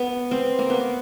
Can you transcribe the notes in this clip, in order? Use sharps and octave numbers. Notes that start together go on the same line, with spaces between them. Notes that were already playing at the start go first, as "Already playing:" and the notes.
Already playing: B3
C4
A#3
B3